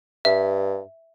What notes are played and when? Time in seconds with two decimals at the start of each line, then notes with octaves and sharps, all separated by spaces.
0.25 G2 E5